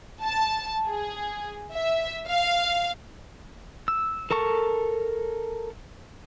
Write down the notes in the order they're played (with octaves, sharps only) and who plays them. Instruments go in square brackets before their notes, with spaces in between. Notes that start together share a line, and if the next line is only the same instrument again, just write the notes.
[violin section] A5
G#4
E5
F5
[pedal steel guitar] E6
A4 A#4 A5 C#6